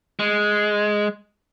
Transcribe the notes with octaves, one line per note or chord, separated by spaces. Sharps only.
G#3